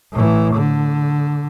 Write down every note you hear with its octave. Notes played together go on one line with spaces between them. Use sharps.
A2 E3
D3